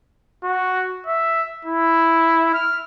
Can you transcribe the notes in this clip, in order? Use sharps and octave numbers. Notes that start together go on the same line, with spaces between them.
F#4
E5
E4
F6